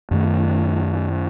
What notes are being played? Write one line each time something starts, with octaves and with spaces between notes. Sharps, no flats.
F#2 D#3 A3